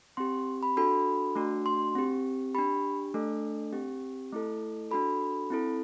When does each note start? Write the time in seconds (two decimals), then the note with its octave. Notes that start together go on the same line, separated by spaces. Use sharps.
0.17 C4 G4 C6
0.63 B5
0.77 D4 F#4 A4 B5
1.35 A3 D4 F#4
1.66 C6
1.95 C4 G4
2.55 D4 G4 B5
3.14 A3 D4 A4
3.72 C4 G4
4.33 A3 E4 A4
4.91 D4 F#4 A4 B5
5.50 C4 E4 A4